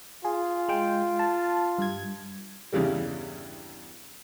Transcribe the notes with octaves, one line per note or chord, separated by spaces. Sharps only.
F4 G#4
G#3 G5
A5
G2 G#6
E2 G2 C#3 E3 G3